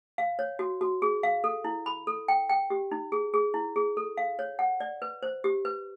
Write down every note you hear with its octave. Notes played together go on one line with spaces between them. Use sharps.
F5
C#5
F#4
F#4
G#4
F5
A4
E4
B5
A4
G5
G5
G4
D#4
G#4
G#4
E4
G#4
A4
F5
C#5
F#5
D5
B4
C5
G4
B4